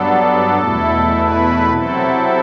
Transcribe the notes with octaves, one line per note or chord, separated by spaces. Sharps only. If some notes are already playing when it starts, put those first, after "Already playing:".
Already playing: G2 F#3 B3 D4 A4
E2 B2 A3 E4
B4
C3 F#3 C4 E4 A4